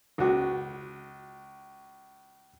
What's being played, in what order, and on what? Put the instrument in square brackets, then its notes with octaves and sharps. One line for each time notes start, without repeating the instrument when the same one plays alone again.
[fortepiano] C#2 F#4